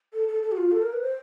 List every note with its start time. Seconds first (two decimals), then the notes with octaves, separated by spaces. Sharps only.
0.13 A4
0.28 A4
0.43 A4
0.52 F#4
0.57 F4
0.72 A4
0.82 A#4
0.93 B4
1.02 C5